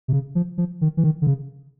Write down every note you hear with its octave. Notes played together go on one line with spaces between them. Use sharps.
C3
C#3
F3
F3
D#3
E3
D#3
D3
C#3